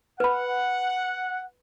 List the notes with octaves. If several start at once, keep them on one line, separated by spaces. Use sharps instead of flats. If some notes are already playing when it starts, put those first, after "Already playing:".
B4 F#5 B5